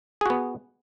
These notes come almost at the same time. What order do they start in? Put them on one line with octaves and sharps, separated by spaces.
G#4 F#4 B3